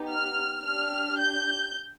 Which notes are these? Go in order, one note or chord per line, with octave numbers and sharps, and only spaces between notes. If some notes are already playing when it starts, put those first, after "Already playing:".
Already playing: B3 D#4 G4
F6
D4 G4 F6
G6